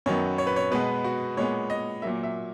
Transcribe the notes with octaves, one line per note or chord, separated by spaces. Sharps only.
F#2 D#3 F#3 B3 C#5
C#5
B4
C#5
B2 G#3 B3 B4
F#4
A#2 G#3 B3 C#5
D#5
A#2 F#3 A#3 E5
E5